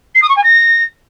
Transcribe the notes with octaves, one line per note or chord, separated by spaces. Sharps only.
C7
D#6
C#6
G#5
A#6